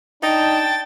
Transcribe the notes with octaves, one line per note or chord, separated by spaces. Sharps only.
D4 D#4 G5 A5 A6